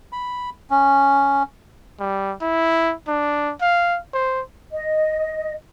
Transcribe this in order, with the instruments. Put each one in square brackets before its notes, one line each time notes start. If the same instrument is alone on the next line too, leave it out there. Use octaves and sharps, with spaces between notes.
[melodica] B5
C#4
[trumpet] G3
E4
D4
F5
C5
[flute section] D#5